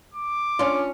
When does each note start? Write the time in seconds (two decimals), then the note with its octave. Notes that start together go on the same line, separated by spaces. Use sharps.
0.14 D6
0.59 C#4 D4 F4